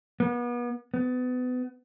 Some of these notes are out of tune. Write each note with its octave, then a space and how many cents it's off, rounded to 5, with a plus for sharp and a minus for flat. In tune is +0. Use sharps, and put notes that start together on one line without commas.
B3 -35
B3 +30